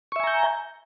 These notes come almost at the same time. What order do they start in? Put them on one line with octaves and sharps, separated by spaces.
C#6 E5 G#5 A#5 G6